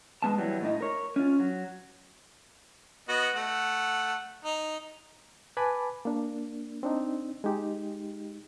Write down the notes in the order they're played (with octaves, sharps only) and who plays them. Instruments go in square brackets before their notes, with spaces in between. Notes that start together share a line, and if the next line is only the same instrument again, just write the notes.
[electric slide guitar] G#3 B3 A5
E3 F#3 G3
A2 A3 D#4
A#4 C#5
C#4 F4
F#3
[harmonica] B3 F#4 D#5
A3 F#5
D#4
[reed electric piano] B4 G#5 A5 B5 D6
A#3 D4
C4 D4 D#4
G#3 D#4 G4